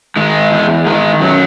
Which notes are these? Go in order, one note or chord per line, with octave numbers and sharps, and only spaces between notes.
D#3 G#3
E2
D#3 G#3
F#2 F#3